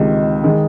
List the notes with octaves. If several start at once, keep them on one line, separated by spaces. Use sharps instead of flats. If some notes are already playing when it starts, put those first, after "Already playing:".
Already playing: C#2 C3 D#3 G#3
D#3 G#3